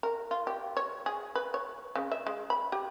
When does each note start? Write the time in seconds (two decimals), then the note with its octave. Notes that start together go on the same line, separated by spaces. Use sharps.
0.03 A#4
0.31 F4
0.47 G4
0.77 C#5
1.06 G#4
1.35 B4
1.54 C#5
1.95 C#3
2.11 E5
2.27 G#3
2.50 B5
2.72 G4